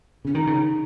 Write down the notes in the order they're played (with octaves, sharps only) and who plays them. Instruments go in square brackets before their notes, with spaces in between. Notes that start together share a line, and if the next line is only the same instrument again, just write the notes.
[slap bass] C#3 [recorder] C#4
[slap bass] D#3 [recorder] D#4
[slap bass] C#3